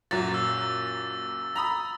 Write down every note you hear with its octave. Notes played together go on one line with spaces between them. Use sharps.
F#1 A#2 F#3 A6
E6
A#5 B5 D#6